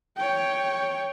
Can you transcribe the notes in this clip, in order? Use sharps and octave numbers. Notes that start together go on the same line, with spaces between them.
C#5 G5